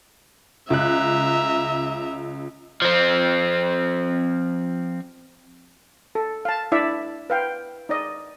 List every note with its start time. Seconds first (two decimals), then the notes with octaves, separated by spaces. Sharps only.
0.70 C#2 E5 A#5 F#6
2.82 F3 C4
6.15 A4
6.45 F5 A5
6.72 D4 E4 D5 E5
7.30 B4 F5 G5
7.89 D#4 D5 D#5